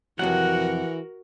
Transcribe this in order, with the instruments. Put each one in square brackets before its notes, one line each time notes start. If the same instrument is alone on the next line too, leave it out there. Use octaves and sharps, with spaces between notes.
[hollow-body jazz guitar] F2 C3 F#3 [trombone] E3 [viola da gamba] F#4 A#4 [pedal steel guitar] F#5